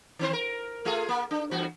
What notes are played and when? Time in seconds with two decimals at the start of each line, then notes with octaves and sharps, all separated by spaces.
0.19 D#3 C4 C5
0.33 A#4
0.85 A3 F4 G#4
1.09 A#3
1.31 D4
1.51 E2 G2 F#4